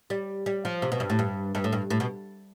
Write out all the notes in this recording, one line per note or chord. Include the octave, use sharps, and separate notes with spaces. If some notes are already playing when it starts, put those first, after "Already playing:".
G3
G3
F3
C3
B2
G2
A2
G2
G2
A2
G2
A2
B2